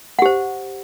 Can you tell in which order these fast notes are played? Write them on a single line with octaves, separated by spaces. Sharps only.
F#5 G4 C5